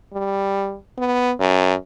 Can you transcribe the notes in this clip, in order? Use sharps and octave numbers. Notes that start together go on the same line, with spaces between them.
G3
B3
F#2